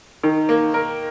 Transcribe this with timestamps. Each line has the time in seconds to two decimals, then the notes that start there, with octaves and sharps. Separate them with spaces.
0.23 D#3 D#4
0.49 A#3
0.74 A#4